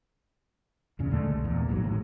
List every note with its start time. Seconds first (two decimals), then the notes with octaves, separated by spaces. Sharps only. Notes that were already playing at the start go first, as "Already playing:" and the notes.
0.99 E2 A#2 C#3
1.11 D3 G#3 A3
1.30 C2
1.44 E2 A#2
1.68 A1 G#2 B2 F#3
1.84 A2 D#3 E3 G#3